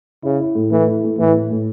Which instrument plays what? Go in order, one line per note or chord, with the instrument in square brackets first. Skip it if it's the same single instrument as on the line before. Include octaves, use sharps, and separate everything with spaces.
[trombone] C#3 [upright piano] E4
[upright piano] E4
A2
[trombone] E3 [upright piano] A3
[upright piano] E4
A3
[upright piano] A2 [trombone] E3
[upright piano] A3
A2